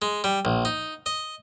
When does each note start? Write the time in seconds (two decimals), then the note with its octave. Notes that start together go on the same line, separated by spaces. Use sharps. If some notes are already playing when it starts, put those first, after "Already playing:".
0.02 G#3
0.24 G3
0.45 A#1
0.65 D#4
1.06 D#5